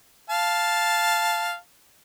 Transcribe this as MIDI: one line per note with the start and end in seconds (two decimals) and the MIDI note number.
0.30 1.56 77
0.30 1.56 81